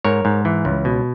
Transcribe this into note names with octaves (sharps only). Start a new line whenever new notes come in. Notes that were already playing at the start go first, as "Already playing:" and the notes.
G#2 A#4 C#5
G#2
E3
C#2
B2